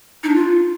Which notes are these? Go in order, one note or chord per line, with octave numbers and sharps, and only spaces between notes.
D#4
D4
F4